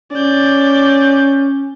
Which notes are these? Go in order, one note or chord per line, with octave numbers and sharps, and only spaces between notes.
C#4 D5 G6